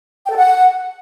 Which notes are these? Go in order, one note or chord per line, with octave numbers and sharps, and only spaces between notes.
G5
A4
F#5